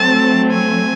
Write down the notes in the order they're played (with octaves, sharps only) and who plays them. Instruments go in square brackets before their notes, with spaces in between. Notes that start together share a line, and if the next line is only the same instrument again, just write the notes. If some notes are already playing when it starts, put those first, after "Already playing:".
Already playing: [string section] F#3 A3 C4 [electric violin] A5
[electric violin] G#5